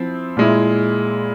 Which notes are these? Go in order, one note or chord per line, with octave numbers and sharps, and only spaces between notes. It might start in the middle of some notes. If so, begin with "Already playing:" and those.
Already playing: F3 C4 E4
A#2 G#3 E4